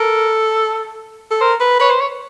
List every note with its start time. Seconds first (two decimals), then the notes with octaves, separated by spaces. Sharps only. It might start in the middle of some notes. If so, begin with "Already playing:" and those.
Already playing: A4 A#4
1.31 A4
1.41 A#4 C5
1.60 B4
1.80 B4 C#5
1.90 C5
2.00 C#5